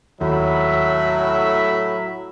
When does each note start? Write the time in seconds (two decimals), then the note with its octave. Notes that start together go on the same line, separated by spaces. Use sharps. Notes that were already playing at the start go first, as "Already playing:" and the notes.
0.21 D#2 A2 F#3 E5 B5